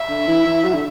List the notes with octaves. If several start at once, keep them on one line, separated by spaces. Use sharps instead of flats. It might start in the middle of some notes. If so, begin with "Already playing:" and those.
Already playing: E5
D3
E3
E3
F#3
D3